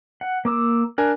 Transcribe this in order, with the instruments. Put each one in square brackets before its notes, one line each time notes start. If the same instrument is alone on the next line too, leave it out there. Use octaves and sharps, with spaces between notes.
[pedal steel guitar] F#5
A#3 D6 E6
[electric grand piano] D4 A#4 G#5 [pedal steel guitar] F#6